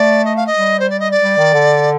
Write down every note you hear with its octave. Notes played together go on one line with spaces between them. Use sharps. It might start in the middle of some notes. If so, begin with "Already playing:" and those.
Already playing: A3 D5
D#5
F5
D#5
G3
C5
D5
D#5
D5
G3
D#3
D3